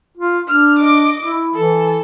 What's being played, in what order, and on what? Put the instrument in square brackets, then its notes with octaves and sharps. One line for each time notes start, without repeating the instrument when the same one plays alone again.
[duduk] F4
[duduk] D4 [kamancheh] F6
[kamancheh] D#5 D6
[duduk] E4
[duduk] E3 [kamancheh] A4